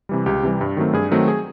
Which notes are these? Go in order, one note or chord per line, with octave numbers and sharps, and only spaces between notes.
C3 E3 G3
C#2 G4
C3 E3 G3
G2
D#3 F#3 A3 C4
G2 G#4
D#3 F#3 A3 C4
G#4